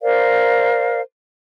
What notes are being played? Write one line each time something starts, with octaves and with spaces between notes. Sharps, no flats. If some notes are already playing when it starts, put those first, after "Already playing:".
A#4 C5 D5 F5